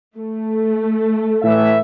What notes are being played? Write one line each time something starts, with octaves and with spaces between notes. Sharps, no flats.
A3
A2 E3 E5